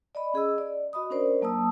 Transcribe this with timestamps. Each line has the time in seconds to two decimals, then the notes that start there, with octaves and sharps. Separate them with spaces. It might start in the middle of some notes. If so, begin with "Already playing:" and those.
0.15 D5 D#5 B5
0.34 C#4 G#4 D#5 E6
0.58 D5
0.93 F#4 D#5 B5 D#6
1.10 C#4 D4 A#4 C5 D5
1.41 F#3 A#3 A5 D#6 E6